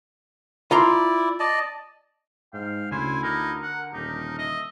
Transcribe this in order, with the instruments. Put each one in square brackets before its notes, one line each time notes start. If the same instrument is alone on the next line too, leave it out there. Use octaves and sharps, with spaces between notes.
[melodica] E4 D5 [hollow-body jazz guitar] F4 A#5 C6
[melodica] D5 D#5 A5
[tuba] G#2 [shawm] F5 [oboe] G5
[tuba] D2 [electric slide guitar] C#3 C5 [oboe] E4 [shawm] G#5
[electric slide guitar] D3 A#4 [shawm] D#4
[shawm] F#5
[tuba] D#1 [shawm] D#4 [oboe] G4
[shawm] D#5 [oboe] E5